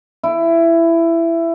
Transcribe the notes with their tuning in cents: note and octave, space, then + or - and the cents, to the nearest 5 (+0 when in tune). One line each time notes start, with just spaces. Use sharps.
E4 +15